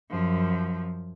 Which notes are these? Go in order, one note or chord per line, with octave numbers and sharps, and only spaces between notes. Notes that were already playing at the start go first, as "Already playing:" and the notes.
F#2 F3